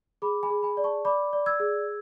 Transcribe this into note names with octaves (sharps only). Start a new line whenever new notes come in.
G#4 B5 D6
G#5 B5
G#4
G#5 B5
D5
A5 C#6
D5 B5 D6
D5
E6 G#6
G#4